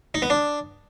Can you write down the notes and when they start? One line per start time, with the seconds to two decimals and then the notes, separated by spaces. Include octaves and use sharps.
0.14 D#4
0.22 B3
0.30 D4